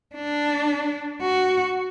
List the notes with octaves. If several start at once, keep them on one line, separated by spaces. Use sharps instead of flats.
D4
F#4